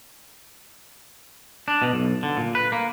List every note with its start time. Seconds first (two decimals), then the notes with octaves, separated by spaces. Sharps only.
1.68 D4
1.82 B2
1.93 B1
2.23 D3
2.37 A#2
2.55 B4
2.72 A#3